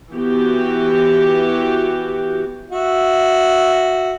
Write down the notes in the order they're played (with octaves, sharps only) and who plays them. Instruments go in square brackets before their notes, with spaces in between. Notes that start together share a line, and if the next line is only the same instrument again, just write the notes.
[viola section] E3 B3 F#4 G4
[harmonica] F#4 E5